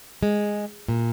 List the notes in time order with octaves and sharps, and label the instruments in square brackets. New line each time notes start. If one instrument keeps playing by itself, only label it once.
[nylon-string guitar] G#3
A#2